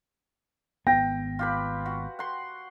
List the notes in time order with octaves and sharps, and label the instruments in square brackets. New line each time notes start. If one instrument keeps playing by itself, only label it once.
[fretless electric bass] G#1 B3 [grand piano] G5 A#6
[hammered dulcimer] F4 G4 B4
F#4
F#5 C6